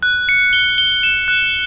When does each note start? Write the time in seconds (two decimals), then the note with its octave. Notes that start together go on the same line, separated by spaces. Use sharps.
0.03 F#6
0.29 C#7
0.53 G7
0.78 G7
1.03 E7
1.28 F#6